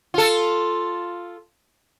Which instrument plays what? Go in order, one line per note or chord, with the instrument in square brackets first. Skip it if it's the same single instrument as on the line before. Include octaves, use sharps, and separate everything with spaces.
[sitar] F4 A4